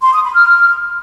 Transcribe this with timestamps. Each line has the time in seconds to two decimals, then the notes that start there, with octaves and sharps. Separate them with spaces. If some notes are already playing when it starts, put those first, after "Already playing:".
0.03 C6
0.13 D#6
0.24 B5
0.35 F6